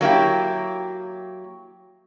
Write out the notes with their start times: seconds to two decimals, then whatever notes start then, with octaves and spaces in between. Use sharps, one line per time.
0.01 F#3 A#3 E4 G4